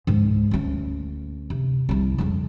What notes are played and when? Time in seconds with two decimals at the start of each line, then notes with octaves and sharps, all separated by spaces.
0.07 C#2 G#2
0.51 D2 C#4
1.50 C3
1.89 C2 E4
2.18 F2 C#3